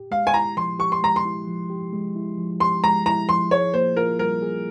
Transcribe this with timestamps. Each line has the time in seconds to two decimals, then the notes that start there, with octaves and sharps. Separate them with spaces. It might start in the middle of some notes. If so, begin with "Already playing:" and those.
Already playing: G4
0.11 G#3 F5
0.27 G#5
0.34 E4 A#5
0.57 F3 C6
0.79 G4 C#6
0.92 C6
1.03 G#3 A#5
1.16 C6
1.25 E4
1.47 F3
1.70 G4
1.93 G#3
2.16 E4
2.38 F3
2.60 G4 C6
2.84 G#3 A#5
3.06 E4 A#5
3.28 F3 C6
3.51 G#4 C#5
3.74 A#3 C5
3.96 F4 A#4
4.19 G3 A#4
4.42 G#4